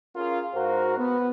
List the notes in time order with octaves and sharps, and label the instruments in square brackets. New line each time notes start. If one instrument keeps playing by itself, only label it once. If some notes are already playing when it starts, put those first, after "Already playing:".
[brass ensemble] C#4 F4 G#4 A#4 F5
G#2 F#4 A#4 C5
B3